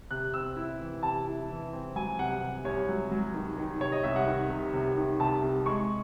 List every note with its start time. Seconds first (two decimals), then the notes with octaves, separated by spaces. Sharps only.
0.11 C3 F#6
0.34 C4 E6
0.56 E4
0.81 E3
1.03 C3 A5
1.26 E4
1.50 E3
1.73 C4
1.96 F#3 G#5
2.19 C2 F#5
2.42 C3
2.64 C2 C#5
2.89 F#3
3.11 F#3
3.34 D#3
3.58 D#3
3.80 C3 C#5
3.92 D#5
4.03 C2 E5
4.16 F#5
4.26 D#3
4.49 C3
4.73 C3
4.96 D#3
5.20 C3 A5
5.42 C2
5.66 G#3 C#6